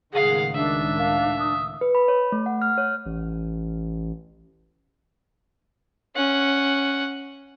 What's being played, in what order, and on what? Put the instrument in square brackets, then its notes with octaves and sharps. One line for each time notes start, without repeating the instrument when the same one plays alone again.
[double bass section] C#2 A2 D#3 [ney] G#4 [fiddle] F5 F#5
[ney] D4 [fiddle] E5
[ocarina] F5
D#6
[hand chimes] B4
B5
C#5
A3
F#5
F6
C#5
[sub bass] A1
[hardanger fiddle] C#4 F#5